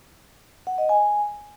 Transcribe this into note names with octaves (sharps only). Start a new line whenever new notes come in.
F#5
D#5
G#5